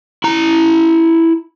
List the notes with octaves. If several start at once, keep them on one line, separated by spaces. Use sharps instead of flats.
E4 A#5